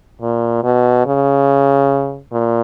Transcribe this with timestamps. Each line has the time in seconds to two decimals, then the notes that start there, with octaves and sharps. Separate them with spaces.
0.22 A#2
0.64 B2
1.06 C#3
2.32 A#2